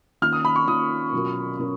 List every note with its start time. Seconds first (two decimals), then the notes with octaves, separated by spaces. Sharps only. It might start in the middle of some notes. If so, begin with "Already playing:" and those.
0.22 D#3 A#3 C#4 F4 F6
0.33 D#6
0.45 B5
0.56 C#6
0.67 D#3 A#3 C#4 F4 D#6
1.12 B2 F#3 C#4 F4 A#4
1.58 B2 F#3 C#4 F4 A#4